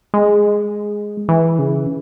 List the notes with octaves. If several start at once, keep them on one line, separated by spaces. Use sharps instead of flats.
G#3
E3
C#3